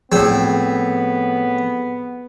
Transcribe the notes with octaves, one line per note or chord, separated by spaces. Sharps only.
A2 F3 B3 C4 G#4